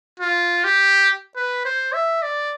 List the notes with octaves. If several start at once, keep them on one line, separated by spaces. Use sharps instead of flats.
F4
G4
B4
C5
E5
D5